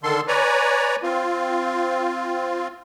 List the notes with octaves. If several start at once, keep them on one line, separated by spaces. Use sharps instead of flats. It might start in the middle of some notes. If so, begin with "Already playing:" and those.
D3 D#3 A4 C6
B4 C#5 D5 G#5 A#5
C4 F4